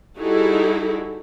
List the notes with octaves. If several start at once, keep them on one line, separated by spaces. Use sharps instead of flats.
G3 D#4 E4 F#4 G#4 A4